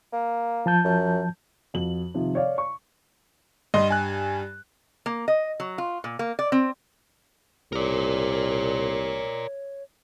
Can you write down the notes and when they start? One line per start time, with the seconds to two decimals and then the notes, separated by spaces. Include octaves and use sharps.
0.13 A#3
0.66 F3 A5 G6
0.85 F#2
1.74 F2 F#4 F#7
2.14 C3 D#3 F3
2.35 C#5 D5 F5
2.58 C#6
3.74 G2 G3 D#5 C6
3.91 G#5 F#6
5.06 A#3
5.28 D#5
5.60 F#3
5.78 F4
6.04 A#2
6.19 A#3
6.39 D5
6.52 C4
7.73 C2 A#4 C#5 D5